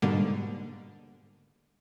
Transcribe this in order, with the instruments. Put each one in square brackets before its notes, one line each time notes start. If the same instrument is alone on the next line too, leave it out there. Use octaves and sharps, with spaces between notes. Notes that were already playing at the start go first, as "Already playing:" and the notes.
[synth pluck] G#2 B2 D3 G3 A#3